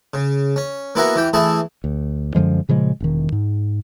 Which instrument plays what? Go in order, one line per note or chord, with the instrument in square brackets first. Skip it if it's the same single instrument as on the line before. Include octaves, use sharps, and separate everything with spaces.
[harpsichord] C#3
C#4
A#3 B3 E4 F#4 G#5 A#5
E3 G4 G5
E3 A3 E4 G#4 A5
[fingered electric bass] D2
F#2 D3 F3 G#3
A#2 C#3 F3 G#3
E1 D#3
G#2